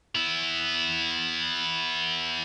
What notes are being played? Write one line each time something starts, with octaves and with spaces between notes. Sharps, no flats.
B3 E4